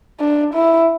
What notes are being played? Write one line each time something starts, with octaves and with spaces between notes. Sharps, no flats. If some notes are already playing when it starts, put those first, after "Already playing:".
D4
E4